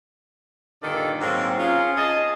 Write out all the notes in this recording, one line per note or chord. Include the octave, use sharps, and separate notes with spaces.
G2 A#2 D3 D#3 A4 D5
G#2 F#3 A#3 C4
C#4 F4 G#4
G#4 D#5 A5